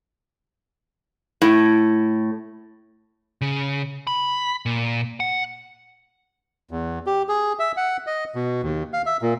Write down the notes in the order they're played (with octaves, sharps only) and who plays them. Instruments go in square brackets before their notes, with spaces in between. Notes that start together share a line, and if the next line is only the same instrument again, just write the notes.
[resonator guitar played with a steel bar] A2
[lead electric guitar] C#3
B5
A#2
F#5
[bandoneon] E2
G4
G#4
E5
F#5
D#5
B2
D#2
F5
E5
A#2